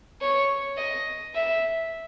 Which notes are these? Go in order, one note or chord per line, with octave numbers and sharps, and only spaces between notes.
C#5
D#5
E5